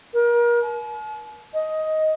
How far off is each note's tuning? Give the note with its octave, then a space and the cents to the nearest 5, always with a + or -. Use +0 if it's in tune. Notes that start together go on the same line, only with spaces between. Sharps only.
A#4 +30
A5 -45
D#5 +10